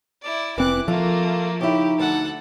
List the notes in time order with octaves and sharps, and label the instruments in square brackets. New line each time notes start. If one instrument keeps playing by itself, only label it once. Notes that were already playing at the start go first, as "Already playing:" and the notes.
[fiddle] E4 D5
[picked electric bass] F1 C4 [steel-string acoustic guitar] E3 [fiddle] D6 F#6
[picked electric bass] F3 [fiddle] A3 A#3 [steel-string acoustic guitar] F4 A4
[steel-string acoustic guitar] C#3 E4 [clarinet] D#4 [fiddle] G4
[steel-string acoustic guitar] D2 [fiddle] A4 F#5